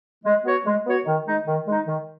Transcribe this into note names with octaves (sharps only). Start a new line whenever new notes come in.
G#3
B3 F#4 C#5
G#3
B3 F#4 C#5
D#3
G#3 D#4
D#3
G#3 D#4
D#3